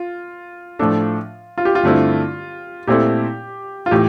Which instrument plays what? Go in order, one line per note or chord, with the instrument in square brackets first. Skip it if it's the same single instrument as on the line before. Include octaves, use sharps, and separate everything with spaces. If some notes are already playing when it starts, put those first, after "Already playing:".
Already playing: [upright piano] F4
[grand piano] A2 F3 A3 D4 A4
[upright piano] F4
G4
F4
[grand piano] G2 D3 A3 C4 E4
[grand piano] A#2 A3 C4 E4 A4 [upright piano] G4
[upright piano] F4
[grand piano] A2 E3 [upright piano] G4